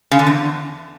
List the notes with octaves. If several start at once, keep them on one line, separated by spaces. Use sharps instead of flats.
C#3
D3
E2